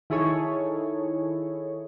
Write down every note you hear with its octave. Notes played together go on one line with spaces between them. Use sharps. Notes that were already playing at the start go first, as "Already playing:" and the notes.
D#3 E4 G#4 A4 C#5